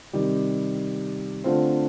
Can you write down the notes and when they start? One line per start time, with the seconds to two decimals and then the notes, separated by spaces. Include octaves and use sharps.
0.13 C3 D#3 G3
1.44 D3 A3 C4 F4 C5